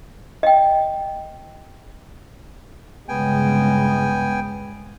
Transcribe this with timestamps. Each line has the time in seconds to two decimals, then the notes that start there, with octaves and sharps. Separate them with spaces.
0.43 D#5 G5
3.09 G1 C#3 G#3 B3 G5 G#5